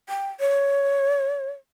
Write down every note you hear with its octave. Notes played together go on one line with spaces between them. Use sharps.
G5
C#5